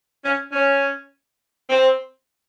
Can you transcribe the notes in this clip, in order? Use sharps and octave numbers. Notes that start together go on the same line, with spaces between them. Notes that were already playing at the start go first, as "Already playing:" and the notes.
C#4
C#4
C4